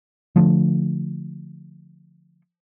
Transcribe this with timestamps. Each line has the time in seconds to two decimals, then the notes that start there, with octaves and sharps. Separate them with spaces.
0.36 D3 F3 A3